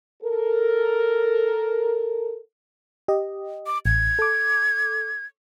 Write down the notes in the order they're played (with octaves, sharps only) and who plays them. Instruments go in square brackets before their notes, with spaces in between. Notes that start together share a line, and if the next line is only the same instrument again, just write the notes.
[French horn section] A4 A#4
[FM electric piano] G4 D#5
[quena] D6
[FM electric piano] A1 [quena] G#6
[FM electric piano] A4 D6